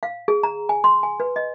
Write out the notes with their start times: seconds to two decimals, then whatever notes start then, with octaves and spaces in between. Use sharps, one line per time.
0.03 F5
0.28 G#4
0.43 A#5
0.69 G#5
0.84 C6
1.03 G#5
1.20 B4
1.36 D#5